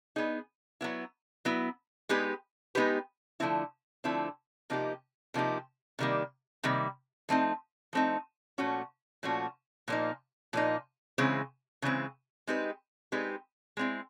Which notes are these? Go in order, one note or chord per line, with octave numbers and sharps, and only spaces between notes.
B3 D#4 G#4
F#3 B3 E4
F#3 B3 E4
G#3 B3 D#4 G4 B4
G#3 B3 D#4 G4 B4
D3 F3 A3 C4 E4
D3 F3 A3 C4 E4
C3 F3 A#3 D#4 G4
C3 F3 A#3 D#4 G4
C3 D#3 G3 A#3
C3 D#3 G3 A#3
F3 A3 C4 D#4
F3 A3 C4 D#4
A#2 F3 A3 C#4 F#4
A#2 F3 A3 C#4 F#4
A#2 F3 A#3 D#4
A#2 F3 A#3 D#4
C#3 E3 G#3 C4
C#3 E3 G#3 C4
G#3 C4 D#4 G4 B4
G#3 C4 D#4 G4 B4
G#3 C4 E4